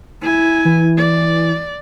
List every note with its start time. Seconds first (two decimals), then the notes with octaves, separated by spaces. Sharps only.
0.22 E4 G#5
0.65 E3
0.97 D5